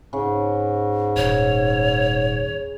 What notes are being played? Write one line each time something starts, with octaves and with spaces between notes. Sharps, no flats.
G#2 C#3
D#1 C#5